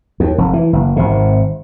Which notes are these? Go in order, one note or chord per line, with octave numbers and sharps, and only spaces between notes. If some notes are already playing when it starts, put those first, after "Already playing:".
D#2
F1
E3
F#1
G#1 C3